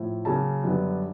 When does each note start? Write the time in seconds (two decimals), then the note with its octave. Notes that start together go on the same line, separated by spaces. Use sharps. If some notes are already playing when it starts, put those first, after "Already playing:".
Already playing: A2 F3
0.25 C#3 F#3 A#3 A5
0.64 F#2 D3 G3 B3